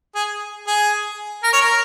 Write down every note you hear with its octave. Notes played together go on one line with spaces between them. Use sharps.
G#4
G#4
A#4
C#5
A#4